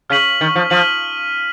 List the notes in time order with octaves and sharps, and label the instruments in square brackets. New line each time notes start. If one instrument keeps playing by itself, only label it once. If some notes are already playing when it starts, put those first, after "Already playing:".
[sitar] C#3 [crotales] F6 B6 D#7 F#7
[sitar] D#3
F3
[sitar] F3 [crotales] F6 B6 D#7 F#7